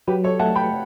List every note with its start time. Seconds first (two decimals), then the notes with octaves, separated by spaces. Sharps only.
0.07 F#3 G4 B4
0.24 A4 C#5
0.39 A3 F#5 A5
0.55 G5 B5